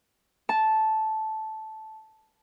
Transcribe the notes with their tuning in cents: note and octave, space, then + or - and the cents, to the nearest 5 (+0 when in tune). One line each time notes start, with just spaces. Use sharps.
A5 -10